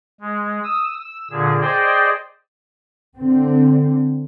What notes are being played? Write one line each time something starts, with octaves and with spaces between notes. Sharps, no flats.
G#3
D#6 E6
E6
A#2 D3 G#4
G#4 C5 D5 D#5 G5
D3 C4